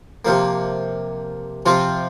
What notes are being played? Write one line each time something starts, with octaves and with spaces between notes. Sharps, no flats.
C3 F3 A#3
C3 F3 C4 F4